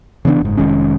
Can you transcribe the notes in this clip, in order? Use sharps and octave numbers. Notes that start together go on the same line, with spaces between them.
C#3 E3 B3 D4
F#1 G#2
F1 D#3 G#3 C#4